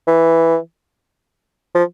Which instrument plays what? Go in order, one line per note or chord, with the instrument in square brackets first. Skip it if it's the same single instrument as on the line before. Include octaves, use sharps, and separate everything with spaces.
[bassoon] E3
F3